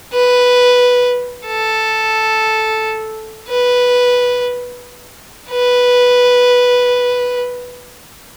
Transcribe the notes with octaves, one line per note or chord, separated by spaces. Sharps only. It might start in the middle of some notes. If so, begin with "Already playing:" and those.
B4
A4
B4
B4